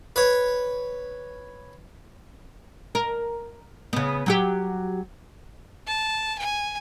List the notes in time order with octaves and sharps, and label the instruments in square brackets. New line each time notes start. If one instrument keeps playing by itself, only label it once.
[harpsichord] B4 C#5
[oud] A#4
C#3 B3
F#3 F#4 G4
[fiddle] A5
G#5